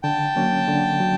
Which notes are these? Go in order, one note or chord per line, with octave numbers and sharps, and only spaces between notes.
D3 G5 A5
F#3 A#3 C#4
D3
F#3